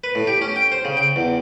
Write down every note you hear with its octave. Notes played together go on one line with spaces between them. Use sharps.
B4
A2
G4
C#4
G5
C5
C#3
G5
E2